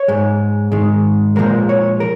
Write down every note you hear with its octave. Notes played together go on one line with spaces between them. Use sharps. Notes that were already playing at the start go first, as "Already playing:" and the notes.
Already playing: C#5
G#2 G#3
G#2 D#3 G#3
A#2 F3 G#3 A#4
C#5
A#4